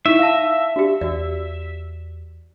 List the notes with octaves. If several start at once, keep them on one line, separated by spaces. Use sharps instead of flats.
D#4 E4 E5 C#6
F5 A5 E6 A#6
D4 F#4 G4
E2 F#4 D5